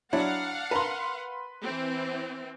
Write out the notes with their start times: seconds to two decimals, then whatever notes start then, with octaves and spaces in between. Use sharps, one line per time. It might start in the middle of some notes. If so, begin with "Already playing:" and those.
0.13 F#3 D4 E4 C#5 F5 F#5
0.71 A#4 B4 A5 A#5 C6
1.63 E3 C4